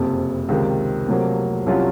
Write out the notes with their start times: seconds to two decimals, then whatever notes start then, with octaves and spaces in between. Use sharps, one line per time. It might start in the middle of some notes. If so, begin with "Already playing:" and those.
Already playing: F#1 F2 C3
0.48 C#2 C3 D#3
1.08 F1 F2 C3 F#3 A#3
1.66 C2 C3 F#3 C#4 F4